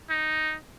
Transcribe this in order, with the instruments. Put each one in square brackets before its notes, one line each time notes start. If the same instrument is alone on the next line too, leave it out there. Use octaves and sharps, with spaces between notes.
[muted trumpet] D#4